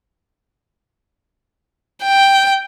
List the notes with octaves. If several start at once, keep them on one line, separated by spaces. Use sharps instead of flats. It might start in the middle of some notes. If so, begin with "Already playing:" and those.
G5